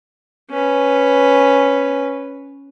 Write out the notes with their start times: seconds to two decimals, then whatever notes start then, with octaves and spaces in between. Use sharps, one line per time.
0.50 C#4 B4